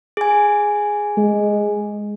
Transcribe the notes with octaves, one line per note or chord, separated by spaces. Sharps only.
G#4 G#5
G#3